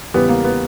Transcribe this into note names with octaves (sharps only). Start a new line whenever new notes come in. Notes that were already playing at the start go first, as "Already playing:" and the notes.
E2 C#3 G3 B3
A#3
B3